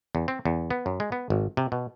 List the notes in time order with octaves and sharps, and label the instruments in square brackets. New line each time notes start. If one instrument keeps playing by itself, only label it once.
[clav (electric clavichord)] E2
C4
E2
B3
F#2
G#3
B3
G#1
C3
B2